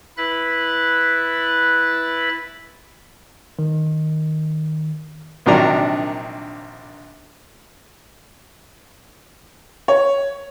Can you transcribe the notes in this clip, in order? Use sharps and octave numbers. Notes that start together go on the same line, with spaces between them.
E4 B4 B5 F#6 A6
D#3
A#1 C3 D#3 F#3 D4 A#5
C#5